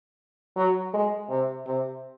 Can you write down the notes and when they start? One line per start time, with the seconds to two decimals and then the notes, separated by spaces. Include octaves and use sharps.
0.56 F#3
0.94 G#3
1.29 C3
1.66 C3